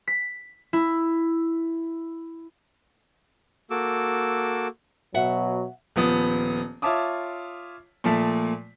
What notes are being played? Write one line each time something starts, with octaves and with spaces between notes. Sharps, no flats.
B6
E4
A#3 F#4 A4 D6 E6
B2 F#3 E5 F#5
D#1 F3 B3 D#6
F4 C#5 E5 A5 D6 D#6
A#2 F3 A3 A5 B6